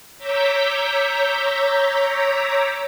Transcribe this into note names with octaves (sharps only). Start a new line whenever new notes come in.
C#5 A#5 D6 E6 G6 B6